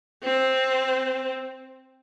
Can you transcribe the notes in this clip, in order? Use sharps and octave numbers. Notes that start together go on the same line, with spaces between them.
C4